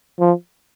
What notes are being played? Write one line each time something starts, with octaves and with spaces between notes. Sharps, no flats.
F3